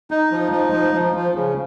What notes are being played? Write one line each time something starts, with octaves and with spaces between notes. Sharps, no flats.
D#4
F3
D#4
F3
F3
F3
C#3